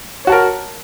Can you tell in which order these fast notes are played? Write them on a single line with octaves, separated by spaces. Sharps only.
C#5 F#4 A5 A#4